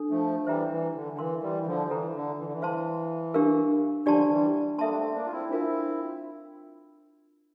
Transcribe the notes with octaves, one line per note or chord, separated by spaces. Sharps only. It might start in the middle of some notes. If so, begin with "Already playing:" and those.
Already playing: D4 A4
F3 A3
E3 G3 C5 E5 G5 A#5
E3
D3
D3
E3 A#4 F5 C6
E3 G3
E3
D3 F3
E3 E4 A4 C5 G5 A#5
D3
E3
D3
E3
C5 F5 A5 C6
D4 G4 A#4 F5
D3 F3 D4 G4 D5 A5 C6
E3 G3
G3 A#3 A4 E5 A5 C6
D4
A3 C4
A#3 D4
F4
C4 E4
C4 D4 E4 F4 A#4 F5